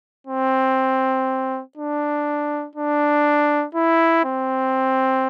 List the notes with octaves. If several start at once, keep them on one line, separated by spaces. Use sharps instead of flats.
C4
D4
D4
E4
C4